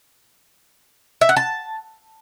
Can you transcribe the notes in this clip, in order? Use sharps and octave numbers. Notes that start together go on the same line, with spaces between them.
E5
F#5
A5